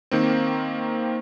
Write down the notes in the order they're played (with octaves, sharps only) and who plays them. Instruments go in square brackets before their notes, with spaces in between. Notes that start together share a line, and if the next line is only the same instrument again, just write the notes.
[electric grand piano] D#3 A#3 C4